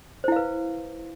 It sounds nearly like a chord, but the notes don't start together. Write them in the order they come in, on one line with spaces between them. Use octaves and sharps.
C5 E4 F5 B4